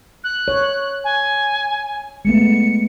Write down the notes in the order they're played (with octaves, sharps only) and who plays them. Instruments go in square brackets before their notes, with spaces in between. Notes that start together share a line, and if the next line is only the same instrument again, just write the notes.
[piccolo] F#6
[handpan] C#5
[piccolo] G#5
[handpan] G#3 A3 B3 [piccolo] C#7